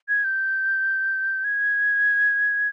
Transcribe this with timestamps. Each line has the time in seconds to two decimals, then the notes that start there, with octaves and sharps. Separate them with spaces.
0.09 G#6
0.24 G6
1.44 G#6